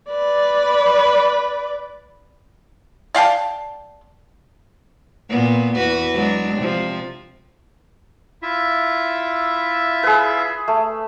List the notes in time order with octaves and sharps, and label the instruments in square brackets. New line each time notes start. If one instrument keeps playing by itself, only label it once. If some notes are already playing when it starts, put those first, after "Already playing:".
[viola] B4 D5
[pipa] D5 F5 G5 A5
[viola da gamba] A#2 B3
E2 F#4 B4
F#3 G#3 D4
C3 F3
[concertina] E4 F4 E5
[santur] G#4 B4
A3